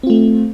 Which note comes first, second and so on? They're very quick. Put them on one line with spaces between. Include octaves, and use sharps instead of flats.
C4 F4 A3